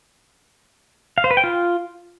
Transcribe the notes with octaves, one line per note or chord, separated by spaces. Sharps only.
F5
C5
B4
G5
F4